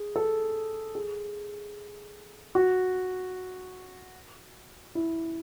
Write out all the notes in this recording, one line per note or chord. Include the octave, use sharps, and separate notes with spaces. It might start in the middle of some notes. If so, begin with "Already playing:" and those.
Already playing: G#4
A4
G#4
F#4
E4